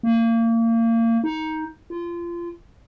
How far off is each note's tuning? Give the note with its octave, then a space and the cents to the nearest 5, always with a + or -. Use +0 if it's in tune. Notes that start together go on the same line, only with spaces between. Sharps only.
A#3 -30
D#4 +15
F4 -25